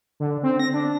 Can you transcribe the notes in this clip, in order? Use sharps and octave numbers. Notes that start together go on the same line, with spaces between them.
D3
C4
A#6
D4